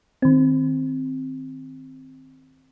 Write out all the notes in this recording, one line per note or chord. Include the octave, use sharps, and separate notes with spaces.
D#3 C4